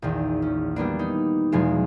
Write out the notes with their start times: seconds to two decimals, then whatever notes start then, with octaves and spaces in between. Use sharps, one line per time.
0.02 A#1 E2 D#3
0.42 C#4
0.76 G3 A#3 B3 D4
0.99 D#4
1.52 E2 B2 F3 F#3 G#3